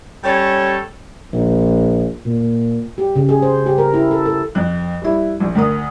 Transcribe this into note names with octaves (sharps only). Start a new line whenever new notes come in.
G3 C#4 A4 C#5
A#1
A#2
G4
C#3
G#4
C5
G4
A#4
E4
A4
A4
F2 F#6
G3 E4
A#1
D2 A#4 D#6